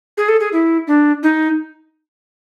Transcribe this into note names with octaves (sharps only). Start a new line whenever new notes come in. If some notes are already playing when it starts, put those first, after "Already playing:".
G#4
A4
G#4
E4
D4
D#4